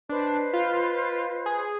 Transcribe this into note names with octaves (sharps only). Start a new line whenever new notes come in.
D4 B4 C5 D#5
F4
G#4